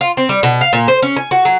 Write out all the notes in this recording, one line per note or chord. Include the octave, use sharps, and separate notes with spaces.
F4
C4
G3
B2
F5
A#2
C5
C#4
G#5
F#4
F#3